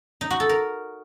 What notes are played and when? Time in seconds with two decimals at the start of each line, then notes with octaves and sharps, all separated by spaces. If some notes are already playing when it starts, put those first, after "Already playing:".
0.21 D#4
0.30 F#4
0.40 A4
0.49 A#4